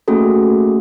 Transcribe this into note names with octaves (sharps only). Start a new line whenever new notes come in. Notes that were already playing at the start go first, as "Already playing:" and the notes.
A3 A#3 C#4 F#4 G#4 A4